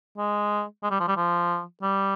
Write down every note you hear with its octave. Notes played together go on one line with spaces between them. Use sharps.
G#3
G#3
G3
F3
G3
F3
G3